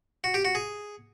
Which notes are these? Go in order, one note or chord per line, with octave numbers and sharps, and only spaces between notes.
F#4
G4
F#4
G#4